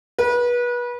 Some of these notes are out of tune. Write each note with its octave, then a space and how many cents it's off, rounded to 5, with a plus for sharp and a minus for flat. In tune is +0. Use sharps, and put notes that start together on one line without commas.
B4 -30